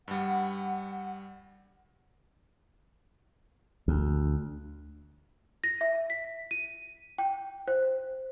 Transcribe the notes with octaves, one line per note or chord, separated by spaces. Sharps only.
G2 G3 F#5
D2
A#6
E5
B6
D#7
G5
C5